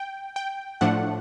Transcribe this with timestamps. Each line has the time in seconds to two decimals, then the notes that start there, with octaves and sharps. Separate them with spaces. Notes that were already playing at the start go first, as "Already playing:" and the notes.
Already playing: G5
0.36 G5
0.81 A2 F3 A3 D4 F#5